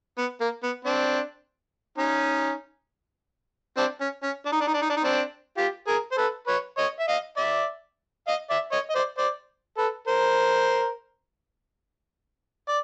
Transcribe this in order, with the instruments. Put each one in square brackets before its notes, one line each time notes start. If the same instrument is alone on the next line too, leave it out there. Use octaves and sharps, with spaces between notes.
[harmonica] B3
A#3
B3
C4 D4
C#4 D#4
C4 D4
C#4
C#4
D4
D#4
D4
D#4
D4
D#4
D4
D#4
C4 D4
F4 G4
G#4 A#4
C5
A4 B4
B4 C#5
C#5 D#5
E5
D#5 F5
D5 E5
D#5 F5
D5 E5
C#5 D#5
D#5
C5 D5
C5 D5
A4 B4
A#4 C5
D5